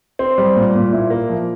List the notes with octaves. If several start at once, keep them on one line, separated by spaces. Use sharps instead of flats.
C4
G3
A#2
A#2
E4
A#3
F3